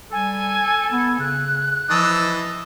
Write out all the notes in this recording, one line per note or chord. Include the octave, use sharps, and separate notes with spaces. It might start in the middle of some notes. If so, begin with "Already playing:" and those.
G3 A4 G#5
B3 G#6
C#3 F#6
E3 F3 D#5 A5 E6